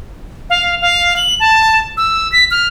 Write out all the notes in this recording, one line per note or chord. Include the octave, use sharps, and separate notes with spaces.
F5
F5
F#7
A5
E6
B6
F6